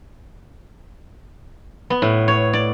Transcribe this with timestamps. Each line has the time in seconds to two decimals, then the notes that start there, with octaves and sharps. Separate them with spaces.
1.90 B3
2.02 A2
2.28 C#5
2.53 D5